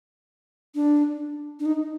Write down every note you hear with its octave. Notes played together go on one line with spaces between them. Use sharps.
D4
D4
D#4